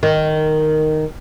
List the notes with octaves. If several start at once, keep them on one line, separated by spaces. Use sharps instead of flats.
D#3